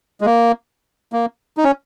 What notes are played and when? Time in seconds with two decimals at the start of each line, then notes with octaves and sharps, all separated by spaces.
0.21 G#3
0.26 A#3
1.13 A#3
1.57 D#4
1.64 C#4